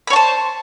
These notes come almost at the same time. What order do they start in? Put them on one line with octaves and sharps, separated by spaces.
B5 C#5 A5 C5